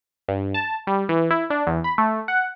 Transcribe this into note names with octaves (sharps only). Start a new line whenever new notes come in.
G2
A5
G3
E3
E4
D4
E2
B5
A3
F#5